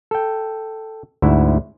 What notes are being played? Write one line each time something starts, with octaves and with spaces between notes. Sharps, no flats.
A4 G5
D2 G#2 E4 E5 F#5